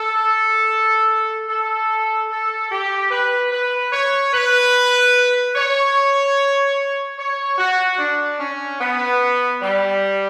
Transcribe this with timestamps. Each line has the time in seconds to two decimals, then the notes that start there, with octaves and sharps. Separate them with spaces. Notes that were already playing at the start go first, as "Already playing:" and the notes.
Already playing: A4
1.48 A4
2.30 A4
2.71 G4
3.11 B4
3.52 B4
3.93 C#5
4.33 B4
5.56 C#5
7.18 C#5
7.58 F#4
7.99 D4
8.40 C#4
8.80 B3
9.62 G3